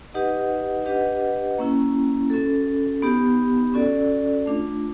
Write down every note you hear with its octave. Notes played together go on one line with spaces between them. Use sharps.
D#4 G4 B4 D#5 F#5
D4 G4 B4 D#5 F#5
A#3 C#4 E4
C#4 F#4 A4
B3 D#4 G4
C#4 F#4 A4 D5
A3 D4 F4